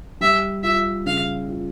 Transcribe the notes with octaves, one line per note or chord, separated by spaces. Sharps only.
G3 E5
F4 E5
C#3 F5
F4